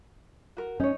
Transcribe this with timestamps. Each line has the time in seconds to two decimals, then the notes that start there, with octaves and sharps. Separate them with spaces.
0.57 F#4 A#4
0.80 C#4 D#4 C#5